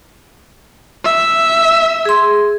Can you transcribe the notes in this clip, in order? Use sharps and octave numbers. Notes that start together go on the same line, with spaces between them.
E5
G#4 C6